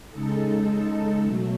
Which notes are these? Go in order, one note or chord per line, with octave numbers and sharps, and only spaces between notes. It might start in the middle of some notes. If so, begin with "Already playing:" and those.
C#3 G#3 D#4 A4
B2 F#3 A3